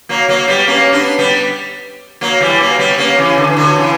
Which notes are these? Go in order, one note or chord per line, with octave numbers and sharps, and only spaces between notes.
F#3 A#3
F#3 A#3
G3 B3
A#3 C#4
B3 D4
G3 B3
F#3 A#3
E3 G3
F#3 A#3
G3 B3
A#3 C#4
C#3 E3
D3
E3
D3 F#3
C#3 E3